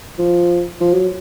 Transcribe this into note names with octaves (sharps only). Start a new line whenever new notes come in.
F3
F3
F#3